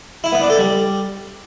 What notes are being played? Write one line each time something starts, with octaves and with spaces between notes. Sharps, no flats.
E4
B3
D4
A4
G3